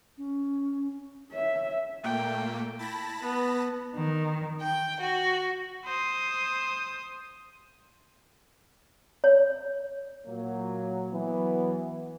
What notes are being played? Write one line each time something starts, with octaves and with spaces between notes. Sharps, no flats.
C#4
C#5 E5
A#2 A3 A#3 G5
E4 A5 B5 A#6
B3
D#3
G5
F#4
C5 D#6
C#5
A#2 F#3 A#3
E3 F#3 B3